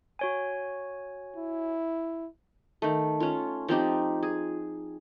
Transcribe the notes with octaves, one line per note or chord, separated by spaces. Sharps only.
F#4 C#5 G#5
E4
D#3 A3
C#4 F4
F3 C4 D#4 G4
G#4